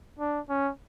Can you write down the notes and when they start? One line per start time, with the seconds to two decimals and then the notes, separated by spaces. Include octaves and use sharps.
0.19 D4
0.49 C#4